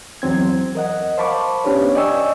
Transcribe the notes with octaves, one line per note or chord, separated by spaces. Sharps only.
E2 F#3 C4 G#6
A#4 D#5 F#5
C5 F5 A5 B5 C#6 D6
B3 C#4 D4 G4 B4 C#5
D5 D#5 G5 G#5 C#6 E6